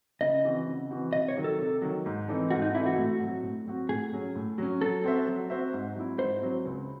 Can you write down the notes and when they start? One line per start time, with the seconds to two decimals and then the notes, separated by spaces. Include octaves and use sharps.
0.21 C#3 D#5
0.45 E3 C4 F#4
0.68 C#3
0.90 E3 C4 F#4
1.13 C3 D#5
1.28 C#5
1.37 D#3 F#3
1.44 A4
1.59 C3
1.82 D#3 F#3
2.06 G#2
2.28 E3 C4 D#4 A4
2.50 G#2 F#4
2.62 D#4
2.75 E3 C4 D#4 E4 A4
2.86 F#4
2.97 A2
3.20 F#3 C4 F#4
3.43 A2
3.66 F#3 C4 F#4
3.88 A2 G#4
4.12 F#3 C#4
4.35 A2
4.58 F#3 C#4
4.81 F#3 A4
5.04 C4 F#4 C5 E5
5.27 F#3
5.50 C4 F#4 C5 E5
5.73 G#2
5.95 F#3 C4 E4
6.19 G#2 C5
6.42 F#3 C4 E4
6.65 C#2